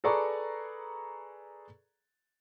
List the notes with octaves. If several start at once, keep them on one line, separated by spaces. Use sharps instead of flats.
G#4 A4 B4 D5 A#5 C#6